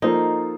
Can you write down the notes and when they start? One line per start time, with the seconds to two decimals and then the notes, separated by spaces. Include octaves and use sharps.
0.02 F3 A#3 D#4 F4 A4 C5